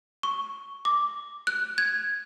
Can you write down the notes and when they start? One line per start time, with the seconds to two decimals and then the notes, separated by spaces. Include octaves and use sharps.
0.23 C#6
0.85 D6
1.47 F#6
1.78 G#6